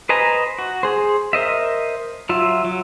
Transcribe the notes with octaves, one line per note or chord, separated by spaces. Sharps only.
B4 C5 D#5 G#5 A#5
F#4
G#4 C5
A#4 C5 D#5 E5
F#3 F4 E5
F#3